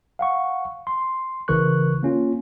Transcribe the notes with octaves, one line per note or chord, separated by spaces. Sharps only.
F5 F#5 C#6
C6
G#1 C#3 E3 A#4 C#6 F#6
A#3 C#4 F4